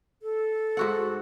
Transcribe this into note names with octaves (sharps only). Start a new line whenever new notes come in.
A4
G#2 F#4 F#5